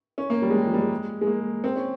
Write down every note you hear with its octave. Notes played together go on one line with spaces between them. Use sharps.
C#4
A#3
G3
G#3
G3
F3
G3
G#3
G#3
A#3
C4
C#4